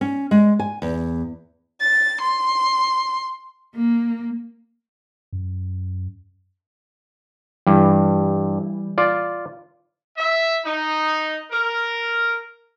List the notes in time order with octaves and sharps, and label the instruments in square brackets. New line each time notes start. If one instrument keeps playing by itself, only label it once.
[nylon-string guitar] C#4
G#3
G#5
E2
[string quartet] A6
C6
A#3
[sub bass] F#2
[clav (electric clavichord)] G2 [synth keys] E3 G3
[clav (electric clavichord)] F4 D5
[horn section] E5
D#4
A#4